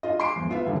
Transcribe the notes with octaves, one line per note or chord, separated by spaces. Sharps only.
D4 F4 D#5
C6 D6 C7 D7
G#1 E2
B3 F4 B4 E5
D#2 D3 G3 A#3 C#4